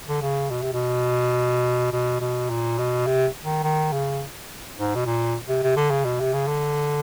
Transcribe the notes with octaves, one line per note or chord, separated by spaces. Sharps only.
D3
C#3
B2
C3
B2
B2
B2
A#2
B2
C3
D#3
D#3
C#3
G#2
B2
A#2
C3
C3
D3
C#3
B2
C3
C#3
D3